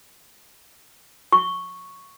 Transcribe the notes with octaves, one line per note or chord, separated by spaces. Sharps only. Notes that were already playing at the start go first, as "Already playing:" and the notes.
C#6